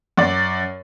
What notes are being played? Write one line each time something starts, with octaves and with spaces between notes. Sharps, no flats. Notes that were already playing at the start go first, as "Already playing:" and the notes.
F#2 D5